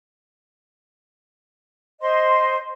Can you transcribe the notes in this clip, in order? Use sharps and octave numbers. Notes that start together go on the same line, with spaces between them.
C5 D#5 C6